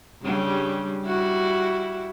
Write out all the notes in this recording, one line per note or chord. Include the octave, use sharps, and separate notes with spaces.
G2 C#3 G3
G3 E4 F#4